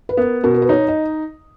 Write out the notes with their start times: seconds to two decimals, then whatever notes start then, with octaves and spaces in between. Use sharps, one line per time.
0.09 B4
0.17 B3 A#4
0.44 B2 A#4
0.54 A#4
0.62 B4
0.69 D#4 C#5
0.88 D#5